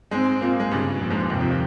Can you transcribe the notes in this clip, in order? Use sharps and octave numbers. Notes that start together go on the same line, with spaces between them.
G#2 G#3 C4
A#2 A#3
G#3
G2 C#3 G3
F2 A#2 F3
G#2 G#3
G2 G3
D#2 C3 D#3
F2 F3
D#3